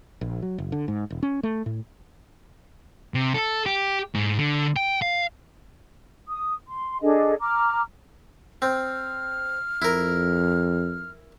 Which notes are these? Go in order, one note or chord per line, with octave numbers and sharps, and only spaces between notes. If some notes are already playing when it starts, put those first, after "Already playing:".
A#1
F#3
F#1
D3
G#2
E1
C#4
A3
A2
C3
A4
G4
G#2
D3
G5
F5
D#6
C6
D4 G#4 A4 D#5
A#5 D6 F6
C4 F6
F2 E4 A#4